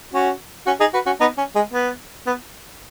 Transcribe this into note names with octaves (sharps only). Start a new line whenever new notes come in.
C#4 F#4
C#4 F#4
D#4 G#4
F#4 B4
C#4 F#4
B3 D#4
C#4
G#3
B3
B3